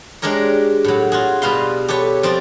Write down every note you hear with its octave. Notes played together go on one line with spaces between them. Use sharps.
G#3 D4 G4 A#4 C#5
A2 F#3
F4 F#4 G#4
B2 G3 B4 F5 C6
G4 A4 B4 C#5
F3 C4 F4 D5